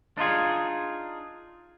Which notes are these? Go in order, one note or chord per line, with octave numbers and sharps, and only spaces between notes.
D4 D#4 F4 G#4